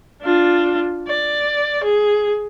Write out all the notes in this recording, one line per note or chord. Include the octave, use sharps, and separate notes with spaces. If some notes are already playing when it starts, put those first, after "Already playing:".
D4 F4
D5
G#4